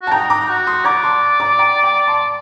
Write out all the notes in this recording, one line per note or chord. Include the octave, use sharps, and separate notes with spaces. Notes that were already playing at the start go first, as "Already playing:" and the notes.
F#4
A5
D#4 G5 A#5
A#5 D6
F#4
C6 D#6
D5 A#5 D6
A5 C6
A#5 D6
G5 A#5
G5 A#5
A5 C6